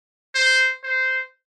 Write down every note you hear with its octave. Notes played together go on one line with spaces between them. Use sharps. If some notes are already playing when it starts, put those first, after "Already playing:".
C5
C5